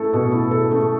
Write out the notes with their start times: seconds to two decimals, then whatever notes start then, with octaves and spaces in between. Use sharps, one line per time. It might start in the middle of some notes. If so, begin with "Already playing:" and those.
Already playing: A3 E4 A4
0.13 B2
0.32 E4
0.51 A4
0.71 A3